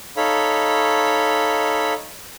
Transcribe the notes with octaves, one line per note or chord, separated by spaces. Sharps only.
D#4 A4 C#5 F5 B5